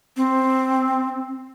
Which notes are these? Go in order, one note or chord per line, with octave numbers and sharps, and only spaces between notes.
C4